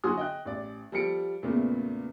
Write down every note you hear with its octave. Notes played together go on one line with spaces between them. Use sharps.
D3 F#3 F#4 G#5 C6 D#6
D#5 G5 F#6
A1 D5
F3 G3 A4 C#7 D7
E2 A#2 C#3 A3 B3